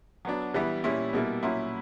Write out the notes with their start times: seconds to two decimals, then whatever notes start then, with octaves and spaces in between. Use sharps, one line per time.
0.25 F#3 B3 D4
0.54 E3 G3 B3 E4
0.84 A#2 G3 C#4 E4
1.13 B2 G3 A#3 E4
1.43 A#2 F#3 C#4 E4